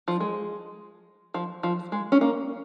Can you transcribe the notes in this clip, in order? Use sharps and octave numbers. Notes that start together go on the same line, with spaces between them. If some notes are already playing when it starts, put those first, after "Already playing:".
F3
G#3
F3
F3
G#3
C#4
A#3